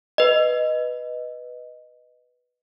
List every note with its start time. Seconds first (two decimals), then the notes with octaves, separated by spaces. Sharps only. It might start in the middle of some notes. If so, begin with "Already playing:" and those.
0.18 B4 D#5